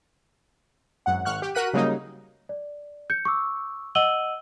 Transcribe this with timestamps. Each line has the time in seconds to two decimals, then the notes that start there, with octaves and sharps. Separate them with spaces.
1.06 G#1 F#2 F#5
1.25 G#1 F#5 C#6 F6 F#6
1.42 G4
1.55 F#4 A#4 F#5 F#6 B6 D#7
1.74 C#3 F#3 G3 A#3 D#4
2.49 D5
3.10 G6 C#7
3.25 C#6 D6 E6
3.95 D#5 F#5 E6 D#7 F#7 G7